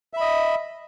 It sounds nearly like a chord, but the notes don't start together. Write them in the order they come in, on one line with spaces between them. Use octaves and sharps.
E5 B5 D#5